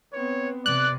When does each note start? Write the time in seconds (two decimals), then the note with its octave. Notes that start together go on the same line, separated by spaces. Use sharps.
0.13 B3 C4 C#5
0.66 C3 D5 F#6